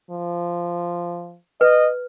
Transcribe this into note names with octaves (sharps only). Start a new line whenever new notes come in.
F3
B4 D#5